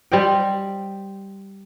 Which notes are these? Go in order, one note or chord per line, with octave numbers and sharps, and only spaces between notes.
G3 C5 D#5 G5